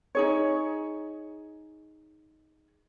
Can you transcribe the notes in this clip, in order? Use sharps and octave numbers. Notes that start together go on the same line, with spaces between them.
D#4 G#4 C#5